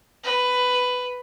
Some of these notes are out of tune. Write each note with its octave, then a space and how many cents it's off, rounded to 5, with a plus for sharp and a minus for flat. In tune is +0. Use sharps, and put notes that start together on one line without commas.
B4 +10